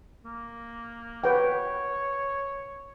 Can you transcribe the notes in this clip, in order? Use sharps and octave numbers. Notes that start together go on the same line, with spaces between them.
A#3
B4 C#5 F#5 G5